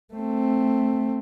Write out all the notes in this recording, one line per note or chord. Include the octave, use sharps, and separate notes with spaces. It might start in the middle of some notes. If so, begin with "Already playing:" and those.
A3 C4